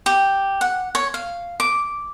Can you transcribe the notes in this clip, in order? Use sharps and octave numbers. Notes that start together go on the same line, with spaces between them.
G4
F#5
C#5
F5
D6